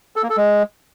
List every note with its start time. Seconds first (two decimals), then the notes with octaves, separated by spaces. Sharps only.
0.16 A4
0.23 A#3
0.30 A4
0.37 G#3